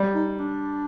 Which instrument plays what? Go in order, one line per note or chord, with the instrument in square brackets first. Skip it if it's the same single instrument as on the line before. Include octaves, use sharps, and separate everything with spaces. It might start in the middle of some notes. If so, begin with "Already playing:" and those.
Already playing: [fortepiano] G3
[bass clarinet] D#4
D#4
D4